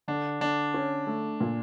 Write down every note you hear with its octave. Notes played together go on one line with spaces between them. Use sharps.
D3 D4
D3 D4
C#4
A3
A#2